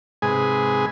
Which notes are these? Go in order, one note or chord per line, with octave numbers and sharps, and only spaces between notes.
G#2 C3 G#3 G#4 B4 G#5